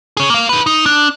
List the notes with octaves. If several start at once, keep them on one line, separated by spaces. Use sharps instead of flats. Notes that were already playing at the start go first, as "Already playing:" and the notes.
G#4 C#5
A#3 F5
D#4 B4
D#4
D4